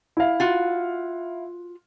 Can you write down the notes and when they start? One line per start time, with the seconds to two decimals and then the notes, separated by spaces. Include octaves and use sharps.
0.17 E4 F5
0.40 F4 F#4